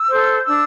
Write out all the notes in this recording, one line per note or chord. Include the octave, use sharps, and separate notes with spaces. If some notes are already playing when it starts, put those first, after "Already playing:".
Already playing: E6
A4 C5
D4 E6